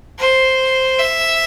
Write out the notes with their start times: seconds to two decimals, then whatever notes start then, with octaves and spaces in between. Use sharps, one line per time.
0.19 C5
0.99 E5